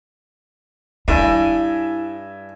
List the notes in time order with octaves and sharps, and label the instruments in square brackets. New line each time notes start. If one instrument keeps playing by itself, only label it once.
[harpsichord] G2 [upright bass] E4 [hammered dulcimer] E5 G#5